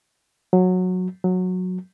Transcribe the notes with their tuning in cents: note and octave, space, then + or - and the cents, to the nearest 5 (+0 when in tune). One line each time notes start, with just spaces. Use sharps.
F#3 -15
F#3 -15